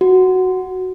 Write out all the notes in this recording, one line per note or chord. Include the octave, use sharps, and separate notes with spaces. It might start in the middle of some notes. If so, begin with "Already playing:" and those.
F#4